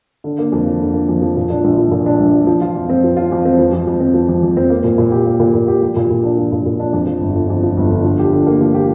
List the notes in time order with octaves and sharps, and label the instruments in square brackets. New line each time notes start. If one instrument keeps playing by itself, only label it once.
[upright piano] D3
A#3
F2
F3
D3
A#3
F2
F3
A#2
D4
A#1
F3
A#2
D4
A#1
F3
F3
F4
F2
C4
F3
F4
F2
C4
F3
F2
F2
C4
F3
F2
F2
C4
A#3
A#2
A#2
G4
A#3
A#2
A#2
G4
F3
A#2
A#2
D4
F3
A#2
A#2
D4
F2
F3
G1
D3
F2
F3
G1
D3
F3
G4
D3
A#3
F3
G4